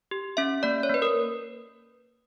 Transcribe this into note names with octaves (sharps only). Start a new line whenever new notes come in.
G4
C#4 E5
A#3 D5
C#5
A#3 B4
A#4